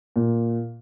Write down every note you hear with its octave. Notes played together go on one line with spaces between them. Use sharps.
A#2